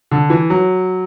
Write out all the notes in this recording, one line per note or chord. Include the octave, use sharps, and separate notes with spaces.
D3
E3
F#3